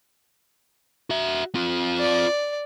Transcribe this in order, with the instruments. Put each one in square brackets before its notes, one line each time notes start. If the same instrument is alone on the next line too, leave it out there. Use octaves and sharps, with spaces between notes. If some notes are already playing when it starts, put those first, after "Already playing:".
[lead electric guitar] F#4 E5
C4 F4
[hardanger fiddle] D5